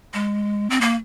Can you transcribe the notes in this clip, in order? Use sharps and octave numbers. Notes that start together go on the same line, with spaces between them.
G#3
C4
A#3